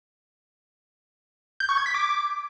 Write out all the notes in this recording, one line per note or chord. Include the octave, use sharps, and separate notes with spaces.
G6
C#6
G#6
B6
D6